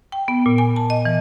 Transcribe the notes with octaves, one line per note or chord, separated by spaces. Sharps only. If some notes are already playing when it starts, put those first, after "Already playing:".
G5
B3
A#2
G#5
A5
D#5
E3